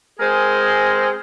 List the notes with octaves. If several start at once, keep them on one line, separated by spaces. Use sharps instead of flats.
G#3 C4 G#4 A#4 C5